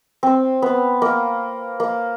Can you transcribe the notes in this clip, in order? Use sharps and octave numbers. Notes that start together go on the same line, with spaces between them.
C4
B3
A#3
A#3